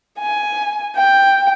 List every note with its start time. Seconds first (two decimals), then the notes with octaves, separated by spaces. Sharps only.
0.19 G#5
0.97 G5